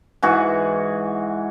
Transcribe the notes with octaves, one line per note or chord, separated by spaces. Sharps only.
G#2 E3 F#4 G#4